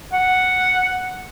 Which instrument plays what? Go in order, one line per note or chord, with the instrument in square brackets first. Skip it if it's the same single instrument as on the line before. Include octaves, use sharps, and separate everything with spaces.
[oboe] F#5